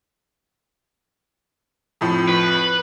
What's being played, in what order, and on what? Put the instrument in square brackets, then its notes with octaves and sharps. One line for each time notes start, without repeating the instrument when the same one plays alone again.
[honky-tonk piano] F2 A2 F3
[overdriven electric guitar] B4